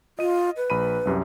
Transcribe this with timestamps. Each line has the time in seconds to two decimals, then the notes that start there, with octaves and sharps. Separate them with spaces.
0.19 F4 D#5 D#7
0.57 B4
0.70 A#1 B5 D#7
1.05 C2 F#2 G4